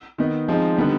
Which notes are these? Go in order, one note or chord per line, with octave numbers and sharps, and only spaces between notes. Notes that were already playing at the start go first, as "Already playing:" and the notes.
D#3 B3 D#4
F3 G#3 C4 D#4
D3 G3 B3 D#4